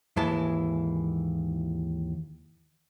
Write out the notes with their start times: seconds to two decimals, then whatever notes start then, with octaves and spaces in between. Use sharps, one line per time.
0.16 D#2 G#2 E3 G#3 E4 A5